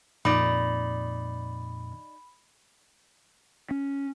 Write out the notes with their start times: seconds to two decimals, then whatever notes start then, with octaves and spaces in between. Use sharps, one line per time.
0.25 F2 A#2 D#4 D5 B5
3.71 C#4